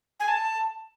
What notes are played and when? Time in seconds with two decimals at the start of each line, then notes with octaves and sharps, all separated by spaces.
0.20 G#5
0.28 A5